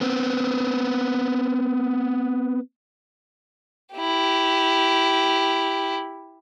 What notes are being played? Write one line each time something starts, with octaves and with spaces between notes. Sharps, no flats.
B3 C4
E4 G4